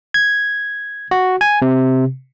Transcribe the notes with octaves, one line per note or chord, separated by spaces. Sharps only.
G#6
F#4
G#5
C3